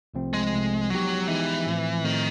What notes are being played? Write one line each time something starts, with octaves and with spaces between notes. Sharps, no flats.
C2 C3 F3 A3 C4
G#3
C2 C3 F3 A3 C4
F3 F#3 G#3 B3 D#4 G4
E3 F3 G#3 B3 D#4 G4
A2 F3 A3 C4
A2 D#3 F3 A3 C4